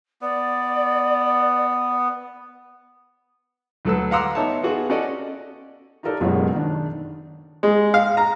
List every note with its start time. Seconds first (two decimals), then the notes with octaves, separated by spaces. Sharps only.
0.21 B3 D5
3.85 D2 F#3 A4 B4 E6
4.11 F5 F#5 A#5 C6 D6 E6
4.35 B3 D#4 C#5 E5 A5
4.63 B3 F4 F#4 G#4
4.90 C#4 F#4 A4 D5 D#5
6.03 D#4 F4 G4 A4 A#4 D5
6.20 F#1 F#2 B2 G#3 C#5 F#5
6.54 D#3 D4
7.63 G#3
7.94 F5
8.17 A#5